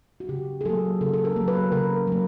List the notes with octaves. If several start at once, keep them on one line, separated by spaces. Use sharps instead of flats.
F#4
C#3 G4
G#4
F#3 A#3 A4
C#3 A4
A4
A#4
F#3 A#3
B4
C#3 A#4
F#3 A#3